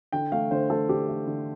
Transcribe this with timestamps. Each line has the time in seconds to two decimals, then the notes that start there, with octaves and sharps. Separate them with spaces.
0.12 D3 G5
0.32 A3 F5
0.51 D3 C5
0.70 A3 A4
0.89 D3 G4
1.08 A3
1.27 D3